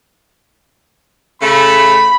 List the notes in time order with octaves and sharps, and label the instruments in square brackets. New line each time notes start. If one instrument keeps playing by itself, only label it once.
[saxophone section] C#3 A3 [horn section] B5